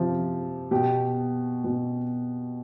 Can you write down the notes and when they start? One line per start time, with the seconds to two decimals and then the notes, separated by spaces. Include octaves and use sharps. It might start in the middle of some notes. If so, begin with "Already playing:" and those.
Already playing: C3 F3
0.71 B2 G4
1.64 B2